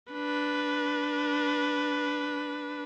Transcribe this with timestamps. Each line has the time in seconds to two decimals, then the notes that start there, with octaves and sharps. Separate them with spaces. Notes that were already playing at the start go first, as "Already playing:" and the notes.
0.13 D4 B4